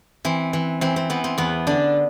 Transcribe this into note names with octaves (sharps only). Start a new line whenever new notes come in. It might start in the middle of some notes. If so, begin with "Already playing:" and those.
E3 C4
E3
E3 C4
C4
E3 B3
C4
E2 B3
D3 D4